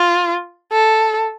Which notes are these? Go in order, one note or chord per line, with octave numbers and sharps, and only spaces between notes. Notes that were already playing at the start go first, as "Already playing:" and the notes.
Already playing: F4
A4